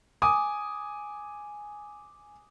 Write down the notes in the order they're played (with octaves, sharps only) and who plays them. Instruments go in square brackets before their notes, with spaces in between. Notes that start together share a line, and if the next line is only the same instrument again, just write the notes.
[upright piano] G#5 D6 D#6